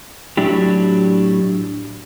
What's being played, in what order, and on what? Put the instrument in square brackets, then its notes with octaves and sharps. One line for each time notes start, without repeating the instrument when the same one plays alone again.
[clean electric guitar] A2 F#3 D4 E4 G4